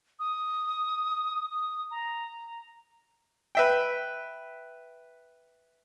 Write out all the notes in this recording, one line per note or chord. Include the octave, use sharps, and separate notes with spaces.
D#6
D#6
A#5
B4 E5 G5